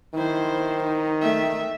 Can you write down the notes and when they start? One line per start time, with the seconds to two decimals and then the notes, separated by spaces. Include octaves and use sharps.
0.14 D#3 E4 C5
0.84 D#4
1.22 A3 E5